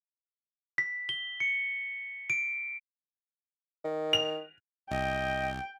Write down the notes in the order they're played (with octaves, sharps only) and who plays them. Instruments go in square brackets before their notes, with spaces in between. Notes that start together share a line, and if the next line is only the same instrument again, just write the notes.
[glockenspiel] B6
G7
C#7
D7
[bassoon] D#3
[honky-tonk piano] F7
[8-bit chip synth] C2 [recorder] D#5 [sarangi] G5